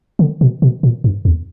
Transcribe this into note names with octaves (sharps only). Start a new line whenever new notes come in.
D3
B2
B2
A#2
G2
E2